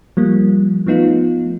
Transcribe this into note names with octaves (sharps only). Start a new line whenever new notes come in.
F3 G3 A#3
F3 A3 B3 D#4 F4